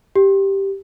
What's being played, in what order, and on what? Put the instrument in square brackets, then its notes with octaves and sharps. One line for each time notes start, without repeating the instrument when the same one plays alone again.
[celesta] G4